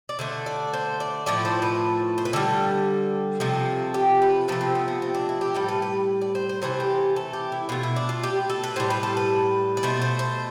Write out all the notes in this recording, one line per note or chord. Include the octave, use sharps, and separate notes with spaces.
D5
D3 A3 C5
D5
C5
D5
A2 F3 A3 D5
C5
B4
C5
B4
D3 G3 A4
C3 F3 A3
G4
B4
C3 F3 A3 B4
C4
B3
B3
C4
D4
E4
G4
A2 G3 A4
B4
B4
D5
C5
C5
C3 E3 A3 C5
G4
A4
G4
E4
B2 A3 F4
E4
D4
F4
G4
A4
B4
A2 G3 C5
B4
A4
B4
D5
B2 A3 C5
C5
C5